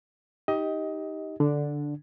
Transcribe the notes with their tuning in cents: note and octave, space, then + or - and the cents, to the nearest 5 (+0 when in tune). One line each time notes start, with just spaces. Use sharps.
D#4 +15 G4 +0 D#5 +20
D3 -5 D4 +0